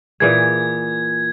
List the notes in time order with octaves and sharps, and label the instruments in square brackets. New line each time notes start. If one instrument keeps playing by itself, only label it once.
[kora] A#2 E3 G#4 [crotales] G#6